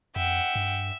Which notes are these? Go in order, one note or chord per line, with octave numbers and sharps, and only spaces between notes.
F2 E5 F#5 G5
G2